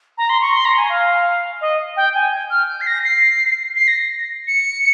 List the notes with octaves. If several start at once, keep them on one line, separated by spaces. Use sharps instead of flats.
A#5
C6
C#6
C6
A#5
G#5
F5
D#5
G5
G#5
F6
G6
C7
A#6
C7
C7
A#6
C#7